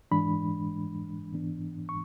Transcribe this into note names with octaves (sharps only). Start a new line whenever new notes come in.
G#2 E3 G#3 D4 B5
G#2 E3 B3 D4
C#6